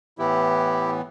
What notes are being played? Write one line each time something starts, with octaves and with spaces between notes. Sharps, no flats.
A2 E3 B3 E4 G4